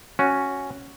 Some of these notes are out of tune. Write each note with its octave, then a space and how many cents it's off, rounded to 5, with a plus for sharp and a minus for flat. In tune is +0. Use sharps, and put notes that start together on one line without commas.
C#4 +0 F#4 +0